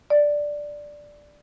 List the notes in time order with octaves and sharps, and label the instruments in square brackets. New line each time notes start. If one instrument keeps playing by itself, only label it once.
[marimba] D5